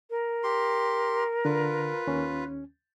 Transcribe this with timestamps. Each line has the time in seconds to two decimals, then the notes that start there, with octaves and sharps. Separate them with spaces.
0.10 A#4
0.44 G4 C6
1.45 D3 F4 B4
2.07 D#2 C#4